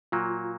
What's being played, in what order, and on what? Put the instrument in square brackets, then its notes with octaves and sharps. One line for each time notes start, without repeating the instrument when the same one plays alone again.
[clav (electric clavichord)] A#2 F#3 A#3 [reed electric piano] F4